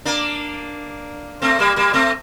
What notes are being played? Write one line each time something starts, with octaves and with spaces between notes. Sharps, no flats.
A#3 D4
A3 C4
G3 A#3
G3 A#3
A3 C4